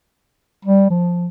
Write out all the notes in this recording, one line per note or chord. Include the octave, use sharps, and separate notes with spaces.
G3
F3